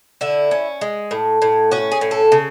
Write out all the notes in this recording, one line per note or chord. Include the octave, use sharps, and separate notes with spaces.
D3 E4
C#4
G#3
A2
A2
C#4 F#4
G#4
A2
A4
C#3